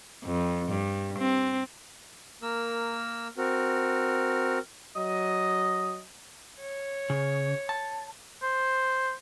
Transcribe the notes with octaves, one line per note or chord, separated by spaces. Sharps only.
F2
G2
C4
A#3 A#4 E6
C4 F#4 A#4
F#3 D#5
C#5
C#3
A5
C5